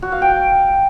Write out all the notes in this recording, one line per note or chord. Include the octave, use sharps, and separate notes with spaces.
F#4
F5
G5